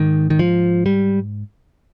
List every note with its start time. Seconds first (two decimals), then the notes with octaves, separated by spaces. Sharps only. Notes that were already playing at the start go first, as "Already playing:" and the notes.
Already playing: G#2 D#3
0.30 D#3
0.39 F3
0.86 G3